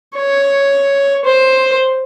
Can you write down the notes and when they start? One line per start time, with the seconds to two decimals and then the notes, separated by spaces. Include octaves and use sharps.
0.16 C#5
1.25 C5